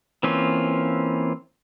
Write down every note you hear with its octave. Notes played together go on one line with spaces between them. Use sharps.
E3 A#3 C4 C#4 F4